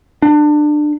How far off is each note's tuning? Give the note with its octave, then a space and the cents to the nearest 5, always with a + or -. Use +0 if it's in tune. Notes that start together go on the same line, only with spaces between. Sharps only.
D4 +25